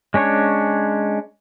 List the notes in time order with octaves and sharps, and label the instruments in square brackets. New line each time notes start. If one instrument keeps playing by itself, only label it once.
[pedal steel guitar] G#3 C#4 D4 C#5